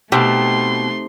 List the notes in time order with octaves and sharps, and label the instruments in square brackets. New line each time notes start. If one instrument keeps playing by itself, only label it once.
[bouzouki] B2 [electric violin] A3 C6 [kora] C4 D#4 G4